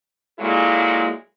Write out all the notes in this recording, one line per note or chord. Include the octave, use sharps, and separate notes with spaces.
A#2 F#3 G#3 A#3 E4 A4